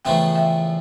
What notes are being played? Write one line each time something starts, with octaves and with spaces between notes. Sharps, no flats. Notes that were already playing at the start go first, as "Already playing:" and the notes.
E2 C#3 F3 A3 E5 G5
E5 G5